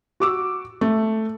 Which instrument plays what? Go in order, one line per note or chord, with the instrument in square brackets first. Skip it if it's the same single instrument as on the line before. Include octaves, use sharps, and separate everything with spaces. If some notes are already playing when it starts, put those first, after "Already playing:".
[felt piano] F#4 D6 E6
A3